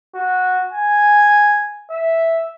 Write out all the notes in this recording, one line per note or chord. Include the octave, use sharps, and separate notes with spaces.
F#4
G#5
E5